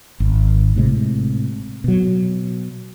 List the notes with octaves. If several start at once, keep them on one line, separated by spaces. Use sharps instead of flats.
G#1
A2 C3 G#3
B2 F#3